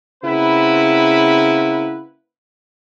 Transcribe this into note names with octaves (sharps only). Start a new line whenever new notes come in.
C#3 A#3 C4 E4 B4 F#5